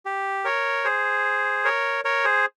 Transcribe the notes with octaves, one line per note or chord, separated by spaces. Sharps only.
G4
A#4 C#5
G#4 C5
A#4 C#5
A#4 C#5
G#4 C5